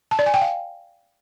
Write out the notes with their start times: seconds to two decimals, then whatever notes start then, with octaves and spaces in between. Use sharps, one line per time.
0.11 A5
0.19 D5
0.26 G#5
0.34 G5
0.41 F5